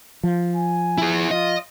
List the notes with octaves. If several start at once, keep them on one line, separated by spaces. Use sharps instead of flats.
F3
G#5
E4 G#4
F4 D#5